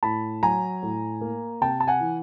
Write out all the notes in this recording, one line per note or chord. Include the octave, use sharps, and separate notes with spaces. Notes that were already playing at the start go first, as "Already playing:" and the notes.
A2 A5 B5
F#3 G#5 A#5
A2
A#3
C3 G5 A5
A5
F#5 G#5
E3